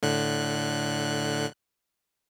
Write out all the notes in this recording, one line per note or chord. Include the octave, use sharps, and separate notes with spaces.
A2 D3 F#6